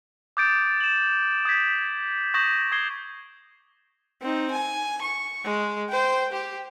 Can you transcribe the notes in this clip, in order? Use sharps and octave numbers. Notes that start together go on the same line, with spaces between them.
D6 D#6 G6 A6 D7
E7 F#7
D#6 G6 G#6 B6
C#6 D#6 G6 A#6 E7 F#7
C#6 D#6 G#6 C7 G7
C4 D#4
G#5
C#6
G#3
C5 G5
G4